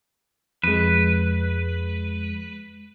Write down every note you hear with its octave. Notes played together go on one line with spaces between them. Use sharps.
F2 G#3 B4